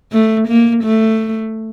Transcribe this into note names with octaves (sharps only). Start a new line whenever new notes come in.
A3
A#3
A3